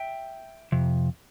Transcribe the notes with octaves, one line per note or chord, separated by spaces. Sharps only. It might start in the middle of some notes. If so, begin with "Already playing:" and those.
Already playing: E5 G5
F2 C3